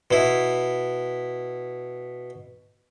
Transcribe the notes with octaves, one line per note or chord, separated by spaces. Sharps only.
B2 E4